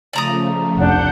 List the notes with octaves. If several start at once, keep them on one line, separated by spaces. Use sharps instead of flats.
C#3 F3 A3 D5 A#5 D#6
F1 D4 F#5 G6